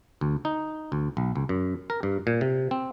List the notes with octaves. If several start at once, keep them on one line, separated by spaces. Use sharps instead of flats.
D2
D#4
D2
B1
C#2
F#2
A#4
G2
A#2
C3
C4